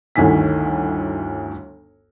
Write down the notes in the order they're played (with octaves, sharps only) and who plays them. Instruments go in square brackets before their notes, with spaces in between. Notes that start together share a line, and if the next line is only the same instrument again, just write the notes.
[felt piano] G1 D2 D#3 E4 G#5 B6